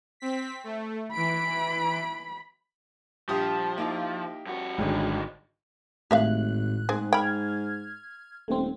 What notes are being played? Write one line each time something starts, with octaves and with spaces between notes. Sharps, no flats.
C4 B6
A3
E3 B5 D7
A#1 F3 G3 G4 D#6
A#3 D#4 E4
G2 F#4
G#1 G2 D3 F#3 C#4 D#4 G#4
G#1 A2 G4 E5 F5 F#6
G#2 C4 G#4
G5 B5 F6 G#6
D#1 A3 C4